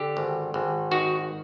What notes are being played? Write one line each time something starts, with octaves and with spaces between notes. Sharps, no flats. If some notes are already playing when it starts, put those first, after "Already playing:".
Already playing: D3 G4
G#1
G#1
D#3 F#4